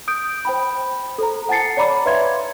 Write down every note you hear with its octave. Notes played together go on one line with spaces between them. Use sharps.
D#6 G6 D7
C5 G5 B5
A4 C5 A#5
F#5 G#5 A5 A6 C7 C#7
C#5 D5 A#5 B5 D6
B4 C#5 E5 F5 C6 G#6